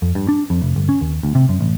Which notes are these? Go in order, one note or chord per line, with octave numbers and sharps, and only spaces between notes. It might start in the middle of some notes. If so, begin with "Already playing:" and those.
F2
G2
D4
F2
F1
G1
C#4
D#2
D2
C3
F#2
A1